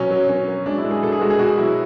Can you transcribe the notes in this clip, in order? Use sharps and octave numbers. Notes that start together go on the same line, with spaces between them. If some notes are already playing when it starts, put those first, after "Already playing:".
Already playing: B2 F#3 C#4
F#3
F#3 C#4
F#3
G#3 D4
E4
G#3
G#4
B2 A4
G#4
G#3 F#4
G#4
B2 F#4
F#3 E4